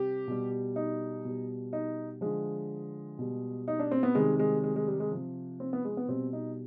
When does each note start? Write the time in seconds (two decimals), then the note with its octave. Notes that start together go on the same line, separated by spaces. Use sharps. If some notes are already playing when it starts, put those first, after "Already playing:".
Already playing: C3 G3 G4
0.28 B2 G3
0.76 D#4
1.25 B2 G3
1.73 D#4
2.21 D3 F3 G#3
3.19 B2 G3
3.68 D#4
3.80 D4
3.91 C4
4.03 B3
4.15 C3 D#3 G3 G#3
4.39 G#3
4.64 G#3
4.76 G#3
4.88 G3
5.00 G#3
5.12 C3 F3
5.60 C4
5.73 B3
5.85 G#3
5.97 B3
6.09 B2 G3 C4
6.33 D#4